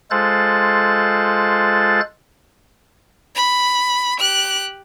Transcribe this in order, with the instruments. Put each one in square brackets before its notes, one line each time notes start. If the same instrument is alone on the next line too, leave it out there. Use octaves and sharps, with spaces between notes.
[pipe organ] G#3 F4 A4 C5 F#6 A6
[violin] B5
G4 F#6